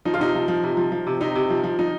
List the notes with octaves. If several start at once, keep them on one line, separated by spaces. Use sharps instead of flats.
F3 D#4
F4
C3 D#4
F3
F3
C3
F3
F3
C3
C3 D#4
C3
F3
F3
F3 D#4